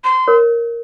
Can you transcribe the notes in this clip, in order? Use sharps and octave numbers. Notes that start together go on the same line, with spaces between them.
C6
A#4 C#5